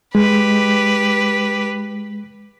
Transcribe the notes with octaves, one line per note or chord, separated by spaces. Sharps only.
G#3 G4 B4